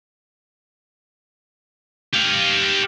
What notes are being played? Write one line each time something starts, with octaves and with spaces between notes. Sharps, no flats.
G4 F5